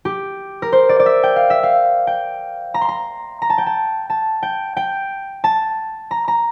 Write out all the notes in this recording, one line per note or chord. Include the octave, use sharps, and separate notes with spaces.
G4
A#4
C5
D5
D5
E5
G5
F5
E5
F5
G5
A#5
C6
A#5
A#5
A5
G5
A5
A5
G5
G5
A5
A#5
A#5